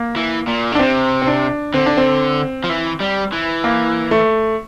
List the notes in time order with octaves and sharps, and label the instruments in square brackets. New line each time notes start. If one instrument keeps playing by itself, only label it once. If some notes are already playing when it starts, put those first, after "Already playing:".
Already playing: [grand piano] A#3
[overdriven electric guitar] E3
A#2
D3
[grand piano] D4
[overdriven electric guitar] C3 [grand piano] C4
[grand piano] C4
D4
[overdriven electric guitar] D3 [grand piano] C4
[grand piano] D4
C4
[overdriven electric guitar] F3
E3
G3
E3
[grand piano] A#3
A3